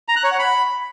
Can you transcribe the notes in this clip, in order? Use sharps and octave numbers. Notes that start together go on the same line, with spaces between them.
A#5
F#6
C#5
F#5
B5